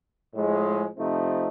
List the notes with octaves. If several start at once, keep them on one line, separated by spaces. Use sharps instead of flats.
A2 F3 G#3
C3 F3 A3 C4 D#4